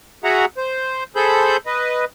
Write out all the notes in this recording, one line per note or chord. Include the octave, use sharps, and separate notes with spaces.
F#4 G#4 E5 F#5 A#5
C5
G#4 A4 C5 B5 G6
B4 D#5